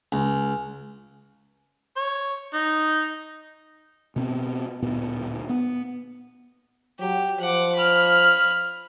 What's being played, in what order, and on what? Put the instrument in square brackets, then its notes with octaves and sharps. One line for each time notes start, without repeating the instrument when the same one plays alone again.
[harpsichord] C#2
[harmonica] C#5
D#4
[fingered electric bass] B2 B3 C4
D1 A#2 B3
B3
[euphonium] F#3 [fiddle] G4
[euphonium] F3 [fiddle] F#5 D6
[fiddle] B5 F6